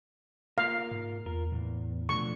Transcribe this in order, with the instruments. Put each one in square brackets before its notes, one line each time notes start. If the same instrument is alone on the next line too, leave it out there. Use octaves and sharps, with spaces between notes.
[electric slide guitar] A#3 F4 A#4 [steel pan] F5
[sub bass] G#2
[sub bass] E2 [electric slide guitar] F4 A#4
[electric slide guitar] E2 [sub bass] A2
[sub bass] B2 [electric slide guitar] F3 A3 D4 [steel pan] C#6